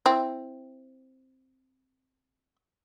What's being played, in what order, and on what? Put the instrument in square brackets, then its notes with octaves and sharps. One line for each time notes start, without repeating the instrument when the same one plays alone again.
[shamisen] C4 E4